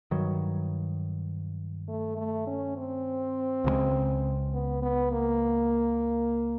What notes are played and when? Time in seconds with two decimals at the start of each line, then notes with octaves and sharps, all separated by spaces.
0.11 G2 D#3 F#3
1.88 A3
2.17 A3
2.47 C#4
2.77 C4
3.64 C#2 C#3 E3 G#3
4.53 B3
4.82 B3
5.11 A#3